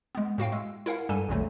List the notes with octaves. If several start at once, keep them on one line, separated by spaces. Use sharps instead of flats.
G#3 B3
A2 F#4 F5 G5
G#3 E6
E4 A#4 F5 F#5
G2 G3 A4 G#5 D#7
A#1 E2 A#2 D3 F#3 A3